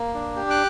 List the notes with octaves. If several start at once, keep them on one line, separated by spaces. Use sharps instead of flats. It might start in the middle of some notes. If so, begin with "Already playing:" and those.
Already playing: A#3
D4
G4
D6 F#6